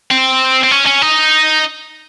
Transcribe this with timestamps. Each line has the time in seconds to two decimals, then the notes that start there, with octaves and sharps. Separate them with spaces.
0.11 C4
0.63 C4
0.71 C#4
0.86 C#4
1.02 D#4